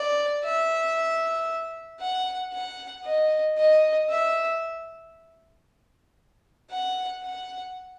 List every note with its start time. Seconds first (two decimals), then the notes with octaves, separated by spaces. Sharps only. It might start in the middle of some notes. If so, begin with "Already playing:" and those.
Already playing: D5
0.44 E5
2.00 F#5
2.53 F#5
3.05 D#5
3.57 D#5
4.10 E5
6.70 F#5
7.23 F#5